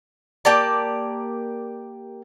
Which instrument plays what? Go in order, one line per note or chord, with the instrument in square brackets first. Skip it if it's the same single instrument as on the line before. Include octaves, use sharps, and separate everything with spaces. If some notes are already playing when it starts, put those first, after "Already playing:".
[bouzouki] A#3 G4 D5 A5